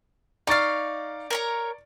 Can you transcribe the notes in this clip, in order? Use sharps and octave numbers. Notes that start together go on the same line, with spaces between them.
D#4 D5 F5 C#6 A6
A#4 C#5 A#5